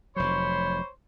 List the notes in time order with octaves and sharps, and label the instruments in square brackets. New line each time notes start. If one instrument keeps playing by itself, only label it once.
[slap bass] F1 F#3 [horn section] C5 C#5 B5